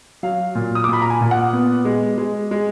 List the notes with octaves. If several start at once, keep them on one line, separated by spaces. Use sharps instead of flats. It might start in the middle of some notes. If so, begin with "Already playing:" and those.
F#3 F5
A#2
D#6
D6
A#2
B5
A#5
G#5
A#2
F#5
B3
G#3
G#3
G#3